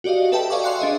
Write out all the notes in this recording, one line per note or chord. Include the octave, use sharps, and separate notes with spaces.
F#4 G4 D5 D#5 F5
A4 B4 E5 G5 A5
D5 D#5 F5 G#5 C#6 D6
F5 C6 F#6 C#7
D4 G#4 D#5 E5